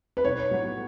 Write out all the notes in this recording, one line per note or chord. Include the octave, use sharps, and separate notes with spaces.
B4
B1 C#5
A2 F#3 B3